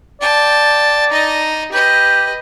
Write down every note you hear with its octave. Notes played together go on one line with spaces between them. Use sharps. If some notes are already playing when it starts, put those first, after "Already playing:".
D5 G5 A5
D#4 D#5
G4 B4 D#5